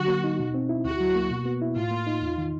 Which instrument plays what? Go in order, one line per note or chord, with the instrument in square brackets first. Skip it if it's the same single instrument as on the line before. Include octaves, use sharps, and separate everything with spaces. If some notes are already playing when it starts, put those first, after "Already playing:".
Already playing: [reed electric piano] D3 F#3 [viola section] F#4
[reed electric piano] A#3
D#4
B2
C4
E4
[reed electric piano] D2 [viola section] F#4
[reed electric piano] F#3
A#3
B2
B3
E4
[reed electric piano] A2 [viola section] F4
[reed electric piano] A#3
D#4
E2
D#3